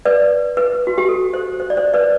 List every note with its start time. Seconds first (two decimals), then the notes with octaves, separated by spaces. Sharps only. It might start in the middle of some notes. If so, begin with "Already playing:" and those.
0.05 B4 D5
0.57 B4
0.87 F#4
0.98 G4
1.09 A4
1.34 C5
1.60 C5
1.70 D5
1.77 C5
1.94 B4 D5